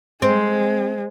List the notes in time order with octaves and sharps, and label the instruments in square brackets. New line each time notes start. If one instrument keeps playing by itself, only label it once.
[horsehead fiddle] G#3 [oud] C4